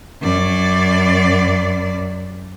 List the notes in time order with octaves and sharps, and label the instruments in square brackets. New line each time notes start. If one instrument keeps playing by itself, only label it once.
[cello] F#2 D5